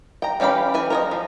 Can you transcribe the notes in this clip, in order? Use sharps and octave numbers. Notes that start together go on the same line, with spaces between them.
G5 A#5
E3 C#4 G4 F5 B5
E3 B4 G#5
A#4 C#5 D#5
F3